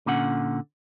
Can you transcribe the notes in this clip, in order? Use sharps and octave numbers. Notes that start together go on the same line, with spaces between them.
A#2 D3 C#4 F#5